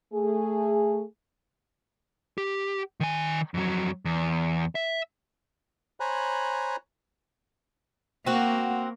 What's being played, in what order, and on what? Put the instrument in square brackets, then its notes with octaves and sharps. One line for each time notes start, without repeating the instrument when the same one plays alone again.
[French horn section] A3 G#4
[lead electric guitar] G4
D#3 G#5
F2 F#3
E2
E5
[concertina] C5 C#5 G#5 A#5 B5 F#6
[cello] A#3 [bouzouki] C4 F#4